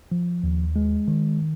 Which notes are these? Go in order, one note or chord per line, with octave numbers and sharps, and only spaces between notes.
F3
D#2
G#3
D#3